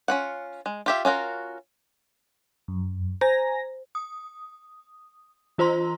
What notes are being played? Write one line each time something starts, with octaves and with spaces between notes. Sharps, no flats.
C#4 F4 F#5
G#3
F4 G4 E5
C#4 F4 F#4 A#4
F#2
C5 G#5 A#5 A#6
D#6
E3 F4 C5 A#5 C6